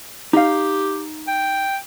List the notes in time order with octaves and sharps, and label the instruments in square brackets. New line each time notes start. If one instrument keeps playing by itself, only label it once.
[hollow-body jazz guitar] D#4 F5 [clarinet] G4
[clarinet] G5